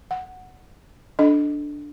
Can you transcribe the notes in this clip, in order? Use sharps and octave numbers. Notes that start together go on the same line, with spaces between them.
F#5
D4 A4 D#5